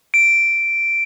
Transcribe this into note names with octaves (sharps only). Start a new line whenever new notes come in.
D7